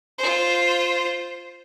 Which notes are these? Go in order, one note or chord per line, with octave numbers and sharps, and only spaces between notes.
F4 C5